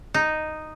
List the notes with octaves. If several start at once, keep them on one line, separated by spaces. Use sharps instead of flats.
D#4